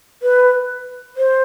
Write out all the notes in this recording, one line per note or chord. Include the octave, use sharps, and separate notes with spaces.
B4
C5